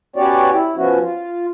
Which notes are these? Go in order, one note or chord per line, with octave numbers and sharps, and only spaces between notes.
B3 C#4 F#4 G4 C#5 D5
E4
F3 B3 C#4 F#4
F4